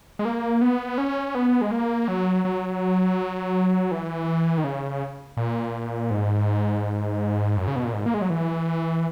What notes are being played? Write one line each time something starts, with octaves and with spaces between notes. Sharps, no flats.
G#3
A#3
B3
C#4
B3
G#3
A#3
F#3
F#3
E3
D#3
C#3
A#2
G#2
F#2
C#3
B2
A#2
G#2
A#3
G#3
F#3
E3